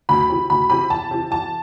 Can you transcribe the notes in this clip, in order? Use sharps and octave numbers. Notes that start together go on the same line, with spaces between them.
D2 B5
C3 E3
D2 B5
C3 E3 B5
E2 A5
C3 E3
E2 A5